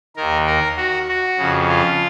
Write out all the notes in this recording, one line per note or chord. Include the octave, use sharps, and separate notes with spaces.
D#2 D#3 A#4
A#4
F#4
F#4
F2 C#3
F4